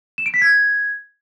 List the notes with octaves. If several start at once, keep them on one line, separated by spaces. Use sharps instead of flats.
E7
D7
B6
G#6